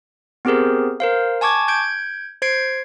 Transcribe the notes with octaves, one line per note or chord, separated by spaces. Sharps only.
B3 C4 G4 G#4 A#4 C5
A#4 C5 F5
G#5 A5 C#6 D6 G#6
G6 G#6 D7
C5 G#6 C7 D7